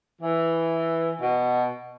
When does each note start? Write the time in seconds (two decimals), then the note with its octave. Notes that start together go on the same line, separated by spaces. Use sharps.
0.21 E3
1.20 B2